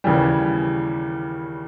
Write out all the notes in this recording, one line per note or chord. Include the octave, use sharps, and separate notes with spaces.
D#2 C#3 E3 G3